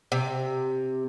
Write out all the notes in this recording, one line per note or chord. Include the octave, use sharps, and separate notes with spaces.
C3